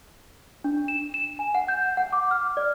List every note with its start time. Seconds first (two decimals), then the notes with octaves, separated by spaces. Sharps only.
0.64 D4
0.88 E7
1.14 E7
1.39 G#5
1.55 F#5
1.68 G6
1.97 F#5
2.13 D6
2.31 F6
2.57 D5